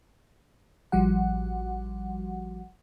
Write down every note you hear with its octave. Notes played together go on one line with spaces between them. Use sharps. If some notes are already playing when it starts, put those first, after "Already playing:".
A1 F3 G3 F#4 F#5